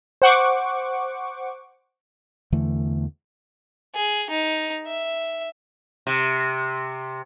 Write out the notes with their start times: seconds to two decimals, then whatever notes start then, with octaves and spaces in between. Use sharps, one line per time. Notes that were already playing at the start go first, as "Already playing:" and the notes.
0.22 C5 F#5 C#6 D6
2.52 E2 D3 E3 A3
3.95 G#4
4.30 D#4
4.87 E5
6.07 C3